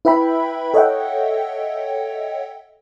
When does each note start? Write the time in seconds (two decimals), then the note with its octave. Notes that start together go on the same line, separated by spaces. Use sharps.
0.05 E4 B4 E5 G5 B5
0.74 A4 C#5 D#5 E5 F#5 G5